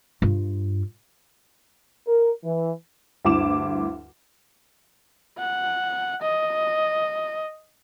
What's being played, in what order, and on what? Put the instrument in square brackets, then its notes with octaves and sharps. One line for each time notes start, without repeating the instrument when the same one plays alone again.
[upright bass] G2 F4
[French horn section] A#4
E3
[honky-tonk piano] D2 G2 E4 D6 E7
[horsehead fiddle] F#5
D#5